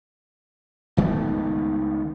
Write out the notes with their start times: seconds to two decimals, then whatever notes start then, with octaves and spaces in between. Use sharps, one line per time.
0.97 C#2 D#3 A3 B3